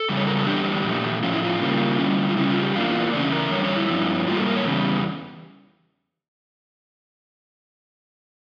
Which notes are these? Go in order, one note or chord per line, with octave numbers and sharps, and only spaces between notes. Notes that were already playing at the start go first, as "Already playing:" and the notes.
Already playing: A4
F2 C#3 G3
C#5
A#4
A4
E2 D3 G3 D4 G4
A#2 F3 A3
A2 F3 C#4 F4
E4
F4
C#3 G3 A#3
D3 G3 C#4
F4
C#3 G3 C#4 E4
F4
G4
E2 E3 A#3 D4 F4
C#3 E3 A3 C#4 D5
A#4
F2 D3 G3 C#5
C#5
E4
G2 F3 C#4
A2 G3 A#3 F4
A4
A#4
C#5
E2 C#3 G3